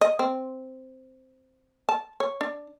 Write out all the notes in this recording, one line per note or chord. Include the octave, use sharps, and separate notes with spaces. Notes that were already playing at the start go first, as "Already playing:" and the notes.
D#5
C4
A5
C#5
D4